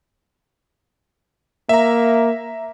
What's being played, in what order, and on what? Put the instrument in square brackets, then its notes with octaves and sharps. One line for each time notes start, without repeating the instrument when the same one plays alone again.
[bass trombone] A#3 [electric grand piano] E5 A#5